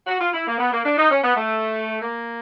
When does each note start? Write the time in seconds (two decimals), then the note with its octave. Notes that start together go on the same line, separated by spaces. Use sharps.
0.07 F#4
0.20 F4
0.33 E4
0.46 A#3
0.58 B3
0.72 A#3
0.84 D4
0.97 D#4
1.10 C#4
1.23 B3
1.36 A3
2.00 A#3